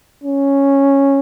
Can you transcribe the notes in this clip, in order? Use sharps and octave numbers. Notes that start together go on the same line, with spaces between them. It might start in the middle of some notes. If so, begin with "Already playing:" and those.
C#4